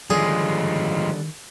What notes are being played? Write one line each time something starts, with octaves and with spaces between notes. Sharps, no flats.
D3 D#3 F3 G3 G#3 G#4